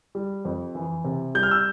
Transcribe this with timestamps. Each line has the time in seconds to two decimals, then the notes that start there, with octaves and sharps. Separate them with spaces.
0.15 G3
0.45 F2
0.75 E3
1.04 C3
1.35 G3 G6
1.43 F6
1.51 E6